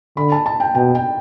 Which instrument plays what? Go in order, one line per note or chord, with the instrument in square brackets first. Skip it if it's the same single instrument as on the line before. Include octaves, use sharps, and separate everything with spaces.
[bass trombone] D3 [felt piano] B5
[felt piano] A5
A5
G5
[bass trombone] B2 [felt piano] G5
[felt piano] G5